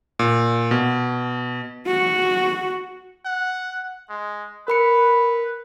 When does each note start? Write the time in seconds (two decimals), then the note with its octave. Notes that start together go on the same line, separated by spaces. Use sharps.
0.19 A#2
0.71 B2
1.87 F#4
3.25 F#5
4.10 G#3
4.68 A#4 B4 B5 C#7